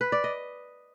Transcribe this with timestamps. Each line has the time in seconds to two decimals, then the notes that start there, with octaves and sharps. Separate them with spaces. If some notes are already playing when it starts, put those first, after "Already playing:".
0.01 B4
0.12 D5
0.24 D#5